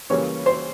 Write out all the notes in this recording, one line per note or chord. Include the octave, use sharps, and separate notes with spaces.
C#3 E3 G3 A#3 C#4 C#5
C5